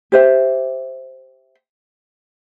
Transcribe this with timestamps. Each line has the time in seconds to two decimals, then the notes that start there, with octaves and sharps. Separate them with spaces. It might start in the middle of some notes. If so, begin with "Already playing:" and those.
0.12 G4 C5 E5